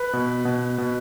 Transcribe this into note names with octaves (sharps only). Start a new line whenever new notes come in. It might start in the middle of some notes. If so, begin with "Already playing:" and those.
Already playing: B4
B2
B2
B2